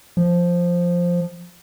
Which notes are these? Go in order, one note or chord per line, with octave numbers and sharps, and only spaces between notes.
F3